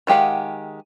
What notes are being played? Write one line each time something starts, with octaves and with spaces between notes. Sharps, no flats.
D#3 G#3 G4 F5 F#5